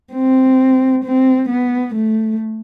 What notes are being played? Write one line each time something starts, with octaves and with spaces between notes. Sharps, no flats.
C4
C4
B3
A3